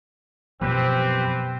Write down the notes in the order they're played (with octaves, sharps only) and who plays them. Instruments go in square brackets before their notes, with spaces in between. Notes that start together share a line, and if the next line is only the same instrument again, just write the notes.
[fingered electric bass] F#2 F3 F#3 [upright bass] B2 [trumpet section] C4 [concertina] G4 B4